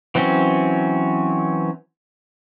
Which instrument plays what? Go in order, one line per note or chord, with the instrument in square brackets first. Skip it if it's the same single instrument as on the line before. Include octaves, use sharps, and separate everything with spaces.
[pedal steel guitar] E3 F#3 C4 C#4